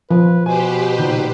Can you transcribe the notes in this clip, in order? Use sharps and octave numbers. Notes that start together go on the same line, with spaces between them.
F3 B4
B2 G4 B4 C5 G#5
A#2 D#3